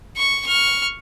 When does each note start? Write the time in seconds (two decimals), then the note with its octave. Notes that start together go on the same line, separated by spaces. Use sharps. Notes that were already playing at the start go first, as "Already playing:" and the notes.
0.17 C#6
0.46 C#6 F6